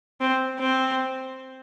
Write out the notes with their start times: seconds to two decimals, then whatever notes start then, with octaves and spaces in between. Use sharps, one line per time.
0.21 C4
0.59 C4